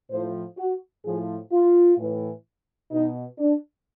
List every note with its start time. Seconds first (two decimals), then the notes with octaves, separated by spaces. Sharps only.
0.10 A2 F3 C5
0.58 F#4
1.04 A2 F3 G#4
1.52 F4
1.98 A2 E3
2.91 B2 D#4
3.38 D4